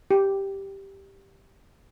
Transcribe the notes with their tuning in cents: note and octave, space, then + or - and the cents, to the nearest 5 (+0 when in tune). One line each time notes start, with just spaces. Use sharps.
G4 +0